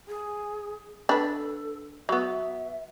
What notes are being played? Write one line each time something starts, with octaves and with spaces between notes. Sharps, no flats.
G#4
D4 A4 B4
F#3 B3 E5